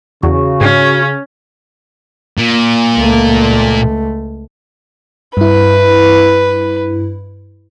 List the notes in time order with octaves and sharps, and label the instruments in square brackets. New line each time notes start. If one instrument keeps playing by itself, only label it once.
[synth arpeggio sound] E2 [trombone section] C#3 [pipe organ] F#4
[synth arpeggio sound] G#2 [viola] C#4
[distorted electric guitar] A#2
[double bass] C#2 A3
[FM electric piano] G2 E4 [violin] B4